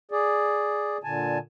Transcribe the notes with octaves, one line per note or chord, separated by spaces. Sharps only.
G#4 D5
A#2 D3 G#5 A5